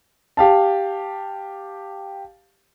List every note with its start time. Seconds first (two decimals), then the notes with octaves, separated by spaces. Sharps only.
0.37 G4 F5 A5